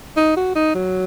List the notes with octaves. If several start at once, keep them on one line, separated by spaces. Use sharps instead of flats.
D#4
F#4
D#4
F#3